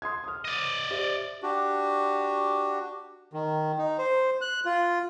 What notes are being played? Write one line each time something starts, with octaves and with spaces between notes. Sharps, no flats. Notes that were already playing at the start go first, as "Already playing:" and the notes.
C6 D#6 G#6
D#6 F6
D5 D#5
G4 C5 E5
D4 F#4 G4
D#3
D#4
C5
F#6
F4